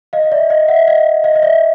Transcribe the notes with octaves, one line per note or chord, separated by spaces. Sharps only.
D#5 F5
D5 E5
D#5 F5
E5 F#5
D#5 F5
D#5 F5
D#5
D5 E5